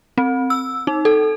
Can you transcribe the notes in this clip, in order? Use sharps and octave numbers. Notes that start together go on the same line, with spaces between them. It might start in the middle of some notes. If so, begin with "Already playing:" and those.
C4
E6
D#4
A4